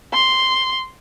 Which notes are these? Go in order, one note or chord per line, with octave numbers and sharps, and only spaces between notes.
C6